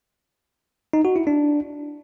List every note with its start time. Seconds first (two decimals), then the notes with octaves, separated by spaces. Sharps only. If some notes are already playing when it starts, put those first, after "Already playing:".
0.93 D#4
1.05 F#4
1.16 E4
1.27 D4